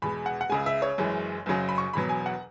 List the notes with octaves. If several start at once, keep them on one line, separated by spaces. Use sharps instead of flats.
E2 B2 G#3 B5
F#5
F#5
C#2 C#3 G#3 G#5
E5
C#5
F#1 F#2 E3 G#3
F#1 F#2 C#3 F#3
B5
C#6
E1 E2 B2 F#3 B5
G#5
F#5